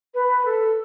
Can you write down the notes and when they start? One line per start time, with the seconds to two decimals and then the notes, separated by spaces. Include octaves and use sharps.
0.14 B4
0.45 A4